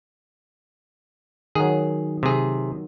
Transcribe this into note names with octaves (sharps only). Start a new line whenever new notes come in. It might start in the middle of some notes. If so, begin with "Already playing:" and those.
D#3 F#3 G#4
C3 G#4